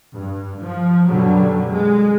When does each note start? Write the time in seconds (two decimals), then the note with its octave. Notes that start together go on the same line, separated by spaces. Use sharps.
0.13 G2
0.62 F3
1.08 F#2 B2 D3 F#3 G3
1.71 G#3